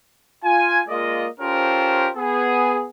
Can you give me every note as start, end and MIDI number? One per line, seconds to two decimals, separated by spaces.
0.44 0.81 65
0.44 0.81 80
0.89 1.27 56
0.89 1.27 58
0.89 1.27 65
0.89 1.27 74
0.89 1.27 75
1.39 2.09 61
1.39 2.09 65
1.39 2.09 67
1.39 2.09 69
1.39 2.09 70
1.39 2.09 72
2.16 2.87 59
2.16 2.87 68